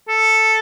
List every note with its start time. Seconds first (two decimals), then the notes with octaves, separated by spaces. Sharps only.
0.09 A4